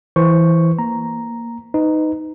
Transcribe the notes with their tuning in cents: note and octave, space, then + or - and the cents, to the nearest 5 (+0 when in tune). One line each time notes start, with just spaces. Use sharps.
E3 +0 C5 +0 C#6 +0
A#3 +0 A#5 +0
D#4 +0 B4 +30